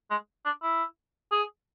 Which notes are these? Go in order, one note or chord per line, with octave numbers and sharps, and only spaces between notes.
G#3
D4
E4
G#4